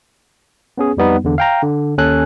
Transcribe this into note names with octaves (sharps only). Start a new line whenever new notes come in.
B3 C#4 G#4
F2 G3 B3 D#4
E2 D3
F5 G5 A#5
D3
D#2 C#4 A4 G#5 F#6